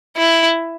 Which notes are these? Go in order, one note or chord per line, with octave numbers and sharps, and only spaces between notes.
E4